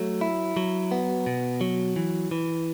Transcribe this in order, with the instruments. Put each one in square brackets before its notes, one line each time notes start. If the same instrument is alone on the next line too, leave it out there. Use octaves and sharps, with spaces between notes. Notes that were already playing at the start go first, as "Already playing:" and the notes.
Already playing: [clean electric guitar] F#3 A3
E4
F#3
B3
B2
F#3
E3
E3